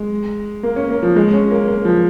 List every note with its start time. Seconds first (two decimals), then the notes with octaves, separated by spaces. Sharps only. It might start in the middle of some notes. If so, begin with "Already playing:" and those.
Already playing: G#3
0.63 A#3
0.76 C#4
0.90 A#3
1.03 F3
1.16 G#3
1.33 C#4
1.51 A#3
1.68 A#3
1.85 F3